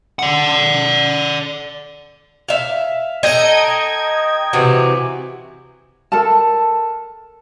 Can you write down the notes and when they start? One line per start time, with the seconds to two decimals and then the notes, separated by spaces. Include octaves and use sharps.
0.19 D5 F#5
2.49 E5 F5
3.23 D#4 A4 D#5 G5 G#6
4.53 C3 E3 F#4
6.12 A4 A#4 A5